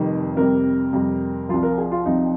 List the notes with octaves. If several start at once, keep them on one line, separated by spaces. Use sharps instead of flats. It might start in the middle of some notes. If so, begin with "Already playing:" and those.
Already playing: F1 F2 C3 D#3 G3
F2 C3 G3 A#4
F2 C3 G3
C2 C3 F3 F4
A#4
G#4
F4
C2 C3 F3 D#4